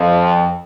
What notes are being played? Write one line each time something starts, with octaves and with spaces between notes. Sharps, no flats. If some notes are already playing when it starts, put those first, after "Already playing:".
Already playing: F2